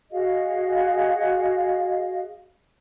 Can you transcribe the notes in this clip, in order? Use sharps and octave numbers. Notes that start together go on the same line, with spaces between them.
F#4 G#4 D#5 F5